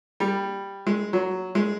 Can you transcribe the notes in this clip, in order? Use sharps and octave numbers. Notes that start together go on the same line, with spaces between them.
G3
G#3
F#3
G#3